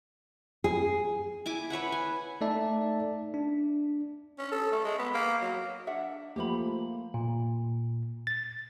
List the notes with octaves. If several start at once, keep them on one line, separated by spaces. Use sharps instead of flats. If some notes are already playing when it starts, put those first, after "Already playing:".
G#4
E4 G#5 D6
B4 C#5 E5 F#5
G#5
A3 D#4 A4 D5 E5 A5
D4
C#4
A4
A3
G#3
B3
A#3
F#3
D4 E5 F#5
F3 A3 A#3 G4 C5 B5
A#2
A6